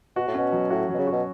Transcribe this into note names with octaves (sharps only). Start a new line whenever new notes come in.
B2 F#4
A2
B2 C#4
F#3
A2 F#4
F#3
B2
C#3
F#4
B2